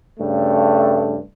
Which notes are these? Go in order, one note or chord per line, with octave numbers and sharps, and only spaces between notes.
G2 C#3 A3